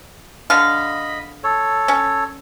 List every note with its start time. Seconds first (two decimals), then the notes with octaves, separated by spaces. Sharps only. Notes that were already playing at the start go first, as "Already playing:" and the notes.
0.50 D3 D#5 F5 B5
1.44 A4 C#5
1.88 C#4